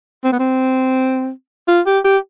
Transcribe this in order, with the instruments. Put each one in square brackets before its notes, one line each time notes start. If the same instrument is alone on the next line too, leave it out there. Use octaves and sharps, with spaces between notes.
[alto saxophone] C4
B3
C4
F4
G4
G4